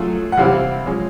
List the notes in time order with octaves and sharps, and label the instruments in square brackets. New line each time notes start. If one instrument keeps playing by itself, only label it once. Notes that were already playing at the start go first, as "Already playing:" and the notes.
Already playing: [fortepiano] F#3 A3 C#4 F4 G#4
[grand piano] F#5
[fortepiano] C3 E3 G3 C4 E4 [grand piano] F5
[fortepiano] F3 G#3 C#4